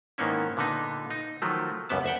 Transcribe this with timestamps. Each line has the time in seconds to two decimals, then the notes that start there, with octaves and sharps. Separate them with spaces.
0.18 G#2 D#3 A#3 B3 C#4 E4
0.57 A#2 D3 B3 D#4
1.10 D#4
1.42 D#3 F3 F#3 A3
1.89 C#2 F#2 G3 B3 A5
2.04 D2 E5 F#5 G5